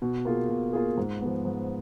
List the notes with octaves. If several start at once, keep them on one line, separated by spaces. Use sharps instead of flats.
B2
A#3 F4 G#4
B2
A#3 F4 G#4
G#2
F3 B3
G#2